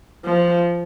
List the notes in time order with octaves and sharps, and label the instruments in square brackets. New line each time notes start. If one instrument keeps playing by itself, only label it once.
[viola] F3